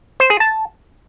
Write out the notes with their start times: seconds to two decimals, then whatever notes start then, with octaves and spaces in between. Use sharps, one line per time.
0.20 C5
0.30 G#4
0.40 A5